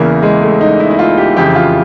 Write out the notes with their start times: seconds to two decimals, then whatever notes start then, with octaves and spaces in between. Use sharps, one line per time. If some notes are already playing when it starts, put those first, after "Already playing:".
Already playing: E2 C#3 E3 A#3
0.23 G#3
0.41 A3
0.61 D#4
0.80 E4
0.90 E4
0.99 F4
1.18 G4
1.36 F2 C#3 E3 G4
1.55 F4